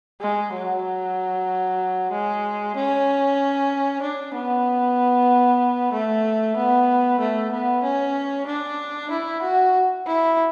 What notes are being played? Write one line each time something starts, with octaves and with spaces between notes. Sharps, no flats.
G#3
F#3
G#3
C#4
D4
B3
A3
B3
A3
B3
C#4
D4
E4
F#4
E4